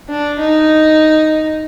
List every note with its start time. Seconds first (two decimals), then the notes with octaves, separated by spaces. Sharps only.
0.09 D4
0.39 D#4